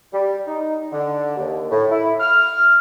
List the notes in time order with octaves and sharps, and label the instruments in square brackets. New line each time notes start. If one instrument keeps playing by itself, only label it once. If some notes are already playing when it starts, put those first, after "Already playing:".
[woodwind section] G3
D#4
D3
D#2
A2
E4
F6